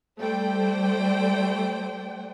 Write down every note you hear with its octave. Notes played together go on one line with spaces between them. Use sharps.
G3 A3 C5 D5 G5